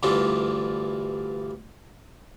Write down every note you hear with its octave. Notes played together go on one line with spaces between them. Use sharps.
D2 G2 E3 D4 F4 D5